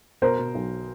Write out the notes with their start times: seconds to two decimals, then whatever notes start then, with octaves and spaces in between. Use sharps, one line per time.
0.22 B2 A#4 C5
0.39 B2
0.55 B1